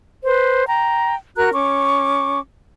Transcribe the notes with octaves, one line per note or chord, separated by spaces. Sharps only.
B4 C5
G5 A#5
F#4 A#4 A#5 F#6
C#4 C#6 D6